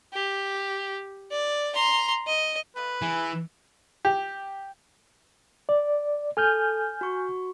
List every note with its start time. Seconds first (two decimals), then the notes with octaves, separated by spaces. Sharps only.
0.13 G4
1.31 D5
1.75 A#5 C6
2.27 D#5
2.76 A3 F4 B4 D#5
3.02 E3 G#4
4.05 G4
5.69 D5
6.37 A4 G#5 F6 G6
7.01 F#4 C#6